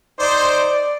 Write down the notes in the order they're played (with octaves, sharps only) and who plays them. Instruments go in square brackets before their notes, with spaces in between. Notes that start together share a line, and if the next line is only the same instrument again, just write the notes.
[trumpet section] D#4 C5 [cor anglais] D5